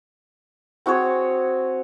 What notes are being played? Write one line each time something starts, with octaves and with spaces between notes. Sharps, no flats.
C4 F#4 G#4 C#5